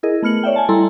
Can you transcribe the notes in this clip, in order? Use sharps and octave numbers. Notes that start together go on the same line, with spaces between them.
E4 G#4 A#4 D#5
A3 B3 F6 C#7 F#7
C#5 D5 E5 G5
G#5 A5
G3 E4 A4 A#5 C6